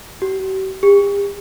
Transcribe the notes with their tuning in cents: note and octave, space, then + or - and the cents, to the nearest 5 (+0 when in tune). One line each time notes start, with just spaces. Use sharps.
G4 -45
G4 +40